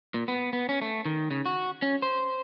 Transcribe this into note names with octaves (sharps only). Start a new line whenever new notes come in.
A#2
B3
B3
C#4
A3
D#3
C#3
F#4
C#4
C5